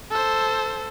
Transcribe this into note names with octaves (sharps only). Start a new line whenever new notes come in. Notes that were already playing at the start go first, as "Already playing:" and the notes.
A4 C5